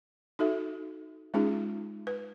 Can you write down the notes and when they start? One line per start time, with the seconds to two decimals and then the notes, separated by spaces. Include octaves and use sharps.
0.39 D#4 F#4 A4 E5
1.34 G#3 C#4 D#4 F4 G#4
2.07 B4